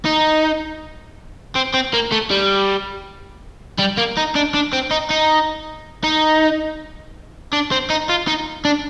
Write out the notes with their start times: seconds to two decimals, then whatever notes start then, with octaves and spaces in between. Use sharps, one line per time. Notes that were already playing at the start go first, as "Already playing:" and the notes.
0.06 D#4
1.55 C4
1.74 C4
1.93 A#3
2.12 A3
2.30 G3
3.79 G3
3.98 A#3
4.17 D#4
4.36 D4
4.54 D4
4.73 C4
4.91 D#4
5.10 D#4
6.04 D#4
7.53 D4
7.72 C4
7.90 D#4
8.09 F4
8.28 D#4
8.65 D4